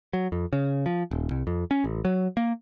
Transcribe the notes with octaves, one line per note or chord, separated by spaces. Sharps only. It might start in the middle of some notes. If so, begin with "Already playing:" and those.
F#3
F2
C#3
F3
D#1
C2
F2
C#4
A1
F#3
A#3